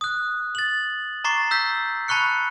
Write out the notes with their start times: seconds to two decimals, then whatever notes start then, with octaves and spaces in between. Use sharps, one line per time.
0.01 D#6 F#6
0.55 A6 F#7
1.24 A#5 C#6 D6 A6 C7
1.51 E6 G6 B6
2.08 A5 B5 C#6 F#6 C#7